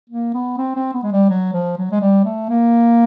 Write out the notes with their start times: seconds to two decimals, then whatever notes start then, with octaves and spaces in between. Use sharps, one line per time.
0.10 A#3
0.34 B3
0.58 C4
0.76 C4
0.93 B3
1.03 G#3
1.12 G3
1.30 F#3
1.53 F3
1.78 F#3
1.92 G#3
2.01 G3
2.25 A3
2.50 A#3